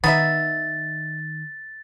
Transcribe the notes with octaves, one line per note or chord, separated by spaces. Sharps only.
D#3 B3 D#4 E5 A6